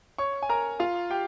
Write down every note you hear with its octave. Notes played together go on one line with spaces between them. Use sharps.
C#5 C#6
G#5
A#4 A#5
F4 F5
G4 G5